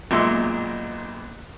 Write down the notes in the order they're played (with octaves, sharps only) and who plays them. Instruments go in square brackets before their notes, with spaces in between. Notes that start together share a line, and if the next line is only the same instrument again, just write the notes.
[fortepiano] B1 F#2 A#2 G#3 E5 C6